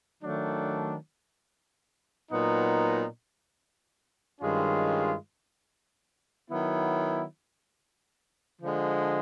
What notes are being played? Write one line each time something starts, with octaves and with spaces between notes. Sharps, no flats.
D#3 F#3 A3 D4
A#2 F#3 B3 D#4
G2 D#3 G#3 C#4 F4
D#3 F#3 B3 E4
D3 F3 G#3